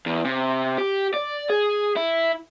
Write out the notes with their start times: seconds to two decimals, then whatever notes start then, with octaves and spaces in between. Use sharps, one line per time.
0.06 E2
0.25 C3
0.78 G4
1.14 D5
1.50 G#4
1.96 E4